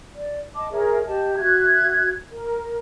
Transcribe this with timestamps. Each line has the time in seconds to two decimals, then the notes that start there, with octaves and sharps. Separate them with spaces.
0.16 D5
0.55 D#5 A5 D6
0.72 G#4 A#4 C#5 E5
1.06 G4 D#5 A5
1.37 F#4 E5 F#6 G#6
2.30 A#4